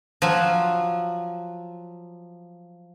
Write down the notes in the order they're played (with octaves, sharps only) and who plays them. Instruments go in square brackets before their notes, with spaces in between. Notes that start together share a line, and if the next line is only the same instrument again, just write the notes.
[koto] F3 F#3